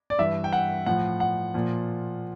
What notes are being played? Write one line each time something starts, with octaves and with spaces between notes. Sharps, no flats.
D5
G2 E3 E5
G5
F#5
A2 F3 F#5
F#5
A#2 F3